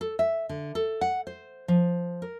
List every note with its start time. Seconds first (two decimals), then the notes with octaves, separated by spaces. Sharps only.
0.01 A4
0.19 E5
0.49 D3
0.75 A4
1.01 F#5
1.27 C5
1.68 F3
2.22 A#4